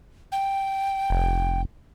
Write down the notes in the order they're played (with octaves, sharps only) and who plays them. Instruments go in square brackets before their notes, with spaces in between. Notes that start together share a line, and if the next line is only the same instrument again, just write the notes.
[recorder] G5
[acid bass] F1